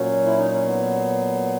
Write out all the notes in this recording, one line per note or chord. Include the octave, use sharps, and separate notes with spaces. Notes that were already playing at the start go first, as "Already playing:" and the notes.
Already playing: A#2 F#3 C#4
E4
D#4
C#4
B3